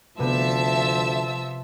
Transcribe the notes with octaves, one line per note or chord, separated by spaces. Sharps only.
D2 C3 F3 B3 E5 A5 E6 D#7